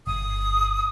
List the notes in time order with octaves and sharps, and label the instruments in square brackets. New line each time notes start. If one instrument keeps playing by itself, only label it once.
[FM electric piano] G1 [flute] D#6